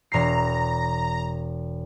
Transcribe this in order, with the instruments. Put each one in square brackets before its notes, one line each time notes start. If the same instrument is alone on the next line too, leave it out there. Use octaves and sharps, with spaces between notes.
[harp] E1 C7 [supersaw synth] A#5